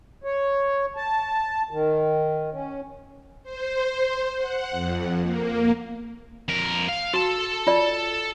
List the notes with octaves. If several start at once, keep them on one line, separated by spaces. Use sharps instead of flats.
C#5
A5
D#3
C#4
C5
F#5
F2
A#3
F2 A#4
F5
F#4 A4 A5
F4 D5